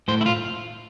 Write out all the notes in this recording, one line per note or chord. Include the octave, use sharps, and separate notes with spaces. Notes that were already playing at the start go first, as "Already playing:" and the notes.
A2 C5
E4
F4